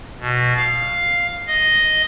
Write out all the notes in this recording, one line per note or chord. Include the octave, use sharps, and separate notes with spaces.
B2
F5
D#5